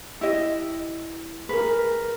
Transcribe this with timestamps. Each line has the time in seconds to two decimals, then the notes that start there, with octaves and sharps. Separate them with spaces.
0.21 E4 G4 D#5
1.49 G#4 A#4 B4